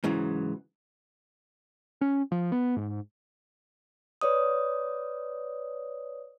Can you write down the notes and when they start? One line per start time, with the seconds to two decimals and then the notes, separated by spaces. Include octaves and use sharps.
0.04 G#2 C#3 E3 F#3
2.01 C#4
2.32 F3
2.52 B3
2.76 G#2
4.21 B4 C#5 D5 D#6